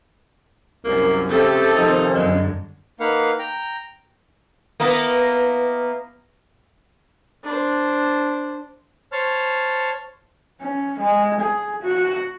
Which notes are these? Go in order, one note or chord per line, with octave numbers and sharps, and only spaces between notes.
C2 F#2 A#3
C#3 A3 C4 G4 A4
C3 D#3 F3 D#4
F#2 D3 G#3
A#3 D#4 B4 F5 F#5
G5 A#5
A#3 B3 E4
D4 C5
C5 C#5 A5 F6
C#4
G#3
G#4
F#4